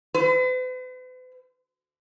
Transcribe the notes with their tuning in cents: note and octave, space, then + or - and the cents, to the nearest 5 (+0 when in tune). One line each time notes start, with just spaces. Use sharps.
B4 +45